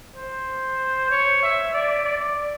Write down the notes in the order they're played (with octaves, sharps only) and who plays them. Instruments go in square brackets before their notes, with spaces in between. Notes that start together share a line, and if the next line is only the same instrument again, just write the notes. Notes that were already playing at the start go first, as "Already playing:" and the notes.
[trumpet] C5
C#5
E5
D5
D5